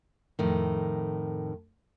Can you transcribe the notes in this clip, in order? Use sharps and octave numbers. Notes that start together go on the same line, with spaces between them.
F2 A2 D#3